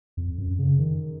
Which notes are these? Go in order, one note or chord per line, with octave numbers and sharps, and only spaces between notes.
F2
F#2
C#3
D#3